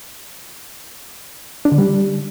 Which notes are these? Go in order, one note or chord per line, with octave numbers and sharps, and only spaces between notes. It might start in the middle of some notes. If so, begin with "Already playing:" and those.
D4
D3
G3